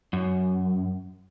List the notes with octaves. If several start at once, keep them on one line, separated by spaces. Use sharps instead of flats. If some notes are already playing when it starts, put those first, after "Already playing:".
F#2